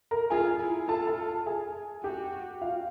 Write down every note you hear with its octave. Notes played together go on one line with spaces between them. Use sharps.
A#4 A#5
F4 G#4 G#5
E4
F4 A4 A5
A4 A5
G#4 G#5
F#4 G4 G5
F4 F5